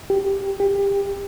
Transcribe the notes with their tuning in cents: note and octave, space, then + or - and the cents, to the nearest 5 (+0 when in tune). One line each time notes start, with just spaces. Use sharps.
G4 +5
G4 +25